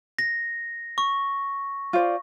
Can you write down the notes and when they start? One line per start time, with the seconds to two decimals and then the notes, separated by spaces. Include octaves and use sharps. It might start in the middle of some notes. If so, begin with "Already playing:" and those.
0.19 A#6
0.98 C#6
1.93 F4 C5 D5